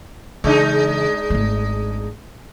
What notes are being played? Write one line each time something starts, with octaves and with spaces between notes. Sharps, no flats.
C#3 E3 G#3 D4 D#4
G#1 A3